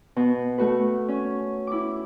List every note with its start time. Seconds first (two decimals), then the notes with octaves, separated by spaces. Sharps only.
0.16 B2
0.58 A3 F#4 B4
1.08 C#4
1.67 E4 D6